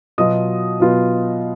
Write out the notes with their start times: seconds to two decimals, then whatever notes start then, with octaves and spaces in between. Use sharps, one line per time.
0.18 B2 F#3 B3 F4 D#5 D#6
0.80 B2 F#3 B3 F4